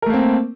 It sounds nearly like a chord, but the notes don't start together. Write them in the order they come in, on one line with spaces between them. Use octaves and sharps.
A#4 A3 A#3 C4